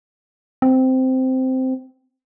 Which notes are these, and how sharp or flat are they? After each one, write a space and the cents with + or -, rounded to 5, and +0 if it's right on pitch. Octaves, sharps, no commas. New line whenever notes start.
C4 -10